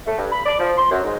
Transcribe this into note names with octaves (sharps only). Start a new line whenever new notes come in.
A3
G2
B5
D5
F3
C6
F#2
G#2